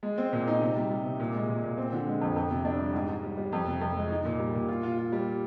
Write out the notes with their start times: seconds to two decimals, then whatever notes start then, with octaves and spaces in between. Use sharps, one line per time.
0.03 G#3
0.18 C4
0.33 A#2
0.47 D#4
0.61 C3
0.76 G3
0.90 G3
1.05 C3
1.20 A#2
1.34 G#3
1.49 A#2
1.63 A#2
1.78 C4
1.92 D3
2.07 G#3
2.21 F2
2.36 F2
2.50 C3
2.65 D4
2.80 G3
2.94 G#2
3.08 G#2
3.23 G3
3.38 G3
3.53 F2
3.67 C3
3.81 F2
3.96 G#3
4.10 D#4
4.25 A#2
4.39 G3
4.54 A#2
4.69 F4
4.83 F4
4.98 F4
5.12 G3